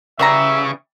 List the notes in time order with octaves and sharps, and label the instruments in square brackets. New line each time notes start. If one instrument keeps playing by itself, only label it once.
[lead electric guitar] C#3 [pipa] E3 G3 A#5 [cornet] E5